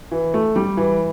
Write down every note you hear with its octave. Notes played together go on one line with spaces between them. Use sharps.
E3
A3
G3
E3